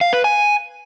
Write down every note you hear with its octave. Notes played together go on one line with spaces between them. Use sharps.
F5
B4
G#5